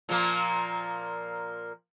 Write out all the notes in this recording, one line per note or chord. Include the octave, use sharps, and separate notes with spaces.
A#2 F3 A#3